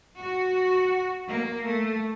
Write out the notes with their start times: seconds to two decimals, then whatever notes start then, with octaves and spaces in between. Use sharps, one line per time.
0.19 F#4
1.28 A#3
1.66 A3